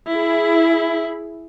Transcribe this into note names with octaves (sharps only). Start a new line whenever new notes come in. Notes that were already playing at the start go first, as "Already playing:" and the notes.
E4 G#4